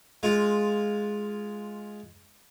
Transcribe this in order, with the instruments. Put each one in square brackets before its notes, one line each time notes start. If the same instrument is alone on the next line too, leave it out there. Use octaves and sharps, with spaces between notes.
[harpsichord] G#3 F4